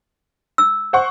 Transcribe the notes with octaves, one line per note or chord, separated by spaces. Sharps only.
E6
C5 F#5 C#6